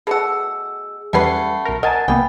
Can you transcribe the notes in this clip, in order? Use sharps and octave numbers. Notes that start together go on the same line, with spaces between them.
B2 A3 G#4 F#5 E6
E2 G3 A3 C#4 B4 F#5 B5 C7
B1 A#4
A#4 D#5 F#5 G#5 A5 A6
C2 A#3 B3 G5 G#5 B5 D#6